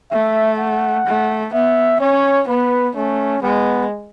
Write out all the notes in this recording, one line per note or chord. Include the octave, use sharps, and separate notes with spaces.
A3 E5
F#5
A3
B3 E5
C#4 C#5
B3 B4
A3 C#4
G#3 B3